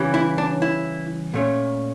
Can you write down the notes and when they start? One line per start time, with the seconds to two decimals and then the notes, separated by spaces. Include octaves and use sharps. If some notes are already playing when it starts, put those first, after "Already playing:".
Already playing: C#3 E3 G3 C#4
0.14 E4
0.38 D4
0.62 E4
1.34 A#2 A3 C#4